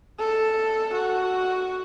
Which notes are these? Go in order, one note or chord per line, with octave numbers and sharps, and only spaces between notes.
A4
F#4